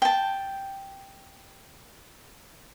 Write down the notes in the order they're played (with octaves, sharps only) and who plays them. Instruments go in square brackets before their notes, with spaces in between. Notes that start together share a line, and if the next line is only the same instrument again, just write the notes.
[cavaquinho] G5 A5